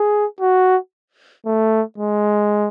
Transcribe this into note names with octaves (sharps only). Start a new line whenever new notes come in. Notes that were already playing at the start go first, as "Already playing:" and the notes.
Already playing: G#4
F#4
A3
G#3